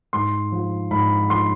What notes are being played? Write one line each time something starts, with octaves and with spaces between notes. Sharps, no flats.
G#2 C6
F3
G#2 B5
F3 C6